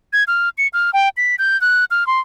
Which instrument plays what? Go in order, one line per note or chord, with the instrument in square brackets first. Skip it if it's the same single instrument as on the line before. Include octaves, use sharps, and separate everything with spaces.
[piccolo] G#6
F6
C#7
F6
G5
B6
G6
F#6
F6
C6